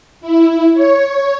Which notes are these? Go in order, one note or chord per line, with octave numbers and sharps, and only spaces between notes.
E4
C#5